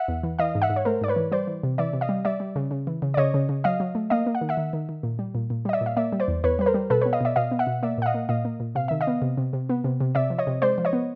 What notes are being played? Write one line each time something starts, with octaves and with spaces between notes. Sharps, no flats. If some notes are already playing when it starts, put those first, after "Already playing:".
Already playing: E5 F#5
E2
E3
E3 D#5 F5
G#2
E5 F#5
G#2
C#5
A3 A#4 C5
G#2 D5
B4 C#5
E3
G3 C5 D5
E3
C3
E3 D5 E5
C3
D#5 F5
G3
G3 D5 E5
G3
C#3
C#3
E3
C#3
D5
C#3 C#5 D#5
C#3
C#3
F#3 D#5 F5
F#3
A3
A#3 D#5 F5
A#3
F#5
D#3
E5 F#5
D#3
D#3
D#3
A#2
G3
A#2
A#2
G3 D#5
D5 E5
A#2
F5
A#3 D5 E5
G3
C5 D5
E2
E2 B4 C#5
G3 B4
A#4 C5
G3
B2 A4 B4
B3 B4 C#5
D#5 F5
B2 D5 E5
B2 D#5 F5
B3
E5 F#5
B2
A#3 D5 E5
A#2 F#5
D#5 F5
A#3
A#2 D#5 F5
A#3
A#2
C3 F5
D#3 E5
D#5 F5
B3
C3
C3
C3
B3
C3
C3
C3 D5 E5
F3
C#5 D#5
C3
G#3 C5 D5
F3
C#5 D#5
B3